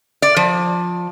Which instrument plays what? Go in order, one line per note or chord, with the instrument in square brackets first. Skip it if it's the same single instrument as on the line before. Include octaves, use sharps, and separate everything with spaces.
[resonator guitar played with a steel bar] D5
F3